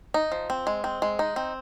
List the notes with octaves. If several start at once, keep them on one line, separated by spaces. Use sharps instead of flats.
D#4
F3
C4
G#3
C4
G#3
D#4
C4